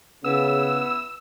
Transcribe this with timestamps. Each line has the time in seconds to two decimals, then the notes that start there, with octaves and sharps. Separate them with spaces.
0.24 C#3 B3 E4 B4 E6